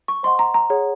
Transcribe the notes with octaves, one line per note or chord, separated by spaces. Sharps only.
C#6
C5 D#5 F#5 C6
A#5
A#5
G#4 C#5 F#5